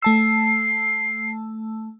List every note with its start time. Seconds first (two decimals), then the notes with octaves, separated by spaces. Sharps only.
0.02 A3 A5 E6 C7